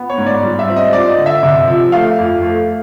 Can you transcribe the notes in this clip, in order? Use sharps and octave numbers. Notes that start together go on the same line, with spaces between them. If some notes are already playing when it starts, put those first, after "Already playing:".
Already playing: B3
C#5
G#2
D5
G3
E5
C4
D#5
F4 D5
D#5
D3
E5
C3
F3
A3 F5
F2
A3